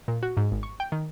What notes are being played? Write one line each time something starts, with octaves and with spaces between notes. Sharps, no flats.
A#2
F#4
G#2
G#1
C#6
G5
D#3